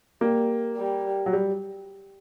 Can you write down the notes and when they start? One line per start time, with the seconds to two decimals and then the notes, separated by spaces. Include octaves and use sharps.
0.21 G3 A#3
0.77 G3
1.26 F#3
1.33 G3